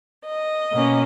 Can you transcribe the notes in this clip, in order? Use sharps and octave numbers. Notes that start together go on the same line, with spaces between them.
D#5
B2 A#3 C#4